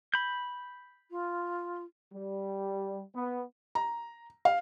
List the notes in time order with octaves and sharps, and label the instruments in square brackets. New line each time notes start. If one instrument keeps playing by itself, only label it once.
[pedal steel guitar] B5 G6
[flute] F4
[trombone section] G3
B3
[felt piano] A#5
F5